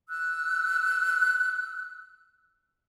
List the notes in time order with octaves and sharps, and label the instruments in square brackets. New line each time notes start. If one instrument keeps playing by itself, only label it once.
[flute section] E6 F#6